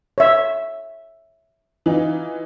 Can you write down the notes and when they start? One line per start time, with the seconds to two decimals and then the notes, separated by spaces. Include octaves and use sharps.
0.18 C#5 E5
1.86 E3 D#4 F4